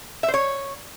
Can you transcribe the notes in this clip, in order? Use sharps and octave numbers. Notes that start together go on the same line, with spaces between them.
E5
C5
C#5